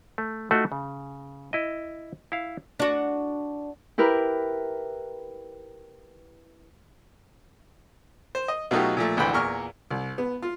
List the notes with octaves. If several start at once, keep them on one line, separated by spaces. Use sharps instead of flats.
A3
A3 D#4 F4 F#4
C#3
E4 D#5
E4 F5
D4 F#4
E4 G4 A#4 B4
C5
D#5
B2 F#3 A3 D#4 F4 G4
A#2 F3 A3
G#1 D2 D3 E3 G5 B5
E2 A#2 A#4 C#6 F6
C2
B3
F4